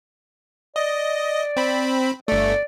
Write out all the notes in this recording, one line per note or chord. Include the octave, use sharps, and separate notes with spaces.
D5 D#5
C4 B5
G1 A3 D5